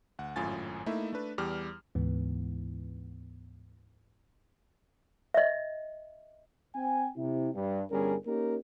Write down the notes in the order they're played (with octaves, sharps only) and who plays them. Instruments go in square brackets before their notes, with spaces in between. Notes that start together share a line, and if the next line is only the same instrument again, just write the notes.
[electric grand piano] D2 F#5
G#1 F#2 A2 F4 G#5 A6
A3 A#3 D#4 E4 E5
A3 D4 B4
E2 G3 G4 D6 F6
[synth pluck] D2 G#2 E3 B3
[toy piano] D#5 E5
[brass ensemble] C4 G5 G#5
C3 E4
G2
G1 G3 C#4 G#4 A#4
A#3 C#4 D#4 G4 A#4